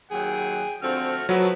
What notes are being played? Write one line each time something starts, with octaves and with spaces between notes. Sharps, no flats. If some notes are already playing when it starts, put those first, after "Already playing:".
D#2 F#3 G#4 G5
D3 F3 A3 C4 F#4 F6
F3 F#3 A3 F#4 B4